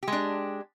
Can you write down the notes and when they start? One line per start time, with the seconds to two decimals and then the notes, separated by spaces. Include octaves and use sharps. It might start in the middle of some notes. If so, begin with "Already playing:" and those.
0.03 G4
0.08 G#3
0.12 D4